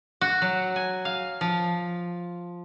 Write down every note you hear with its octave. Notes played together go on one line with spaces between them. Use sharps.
F#4
F#3
G#5
F5
F3